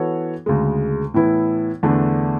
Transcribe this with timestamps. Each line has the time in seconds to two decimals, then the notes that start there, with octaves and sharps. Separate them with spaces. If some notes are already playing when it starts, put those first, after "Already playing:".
Already playing: E3 B3 F#4 A4 C#5
0.46 D2 C#3 G#3
1.14 A2 E3 B3 E4
1.83 E2 D3 A3 D4